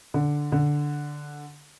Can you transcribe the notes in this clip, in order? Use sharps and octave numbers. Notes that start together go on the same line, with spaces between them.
D3
D3